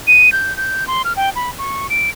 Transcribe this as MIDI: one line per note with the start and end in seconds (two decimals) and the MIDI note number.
0.07 0.32 99
0.32 0.55 91
0.57 0.87 91
0.87 1.02 84
1.05 1.13 89
1.16 1.30 79
1.36 1.50 83
1.58 1.87 85
1.90 2.10 98